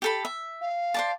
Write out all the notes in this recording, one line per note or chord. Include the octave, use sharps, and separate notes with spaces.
G4 A4 B5
E5
F5
C5 D5 A5